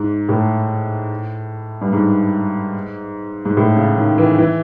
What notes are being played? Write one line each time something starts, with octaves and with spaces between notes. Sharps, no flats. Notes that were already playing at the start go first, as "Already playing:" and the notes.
Already playing: G#2
A2
G2
G#2
G#2
A2
C#3
D#3
E3
E3